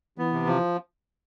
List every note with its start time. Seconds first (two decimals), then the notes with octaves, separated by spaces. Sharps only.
0.18 E3 B3
0.32 C3
0.47 F3